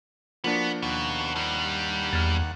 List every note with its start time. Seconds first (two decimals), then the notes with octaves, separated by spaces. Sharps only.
0.44 F3 A#3 B3 D4 F#4
0.82 D#2 B2 F#5
1.36 G2 G3
2.13 E2 F6 G#6 A6